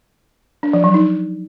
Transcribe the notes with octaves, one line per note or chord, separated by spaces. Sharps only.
D4
F3
F#3
D#4